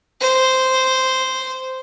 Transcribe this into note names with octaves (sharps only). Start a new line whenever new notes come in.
C5